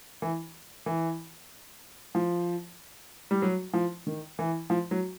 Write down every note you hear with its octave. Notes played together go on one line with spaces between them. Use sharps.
E3
E3
F3
G3
F#3
F3
D#3
E3
F3
F#3